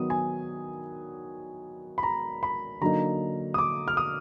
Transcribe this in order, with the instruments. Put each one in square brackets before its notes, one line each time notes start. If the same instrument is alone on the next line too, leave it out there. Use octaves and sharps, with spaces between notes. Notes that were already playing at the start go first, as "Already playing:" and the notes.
Already playing: [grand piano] D#3 F#3 B3 D#6
G#5
B5
A#5
B5
D3 F#3 A#3 D#4 A#5
D#6
D6
F6
D#6